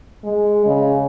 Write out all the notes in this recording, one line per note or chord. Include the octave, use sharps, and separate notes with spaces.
G#3
C#3